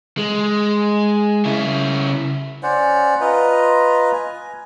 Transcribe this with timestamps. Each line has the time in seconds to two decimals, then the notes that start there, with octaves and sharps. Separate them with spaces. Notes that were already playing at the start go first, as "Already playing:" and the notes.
0.17 G#3
1.45 C#3 E4
2.63 C#4 C5 D5 F#5
3.21 F4 B4 D#5 A#5
4.13 G#5